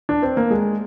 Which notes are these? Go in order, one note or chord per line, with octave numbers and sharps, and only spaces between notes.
D4
C4
A#3
G#3